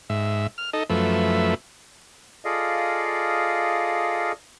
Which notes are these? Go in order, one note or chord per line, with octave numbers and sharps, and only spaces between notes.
G#2 E5
F6
D#4 A4 D#5
F#2 F3 A3 B4 E5
F4 G#4 A4 D5 D#5 F5